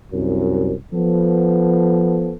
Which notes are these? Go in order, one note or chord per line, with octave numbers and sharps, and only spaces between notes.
C2 F#2
F3 B3 A4